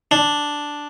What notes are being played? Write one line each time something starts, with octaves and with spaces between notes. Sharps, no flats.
D4